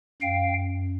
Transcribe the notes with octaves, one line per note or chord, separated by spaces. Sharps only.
F#2 F5 G5